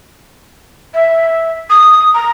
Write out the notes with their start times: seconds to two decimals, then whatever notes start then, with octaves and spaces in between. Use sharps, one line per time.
0.94 E5
1.70 D#6
2.14 A#5